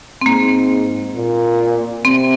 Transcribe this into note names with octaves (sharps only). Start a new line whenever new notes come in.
C4
G#2 A#3
A#2
C3 C4